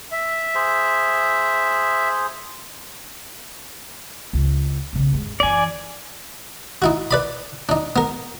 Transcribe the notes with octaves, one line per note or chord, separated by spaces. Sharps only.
E5
G#4 C5
C#2 D4
B1 C#3
D#2 G#2
F#2 E3 D5 G#5
D#4 E4 F#4
B4 D5 B5
D4 D#4
B3 A#4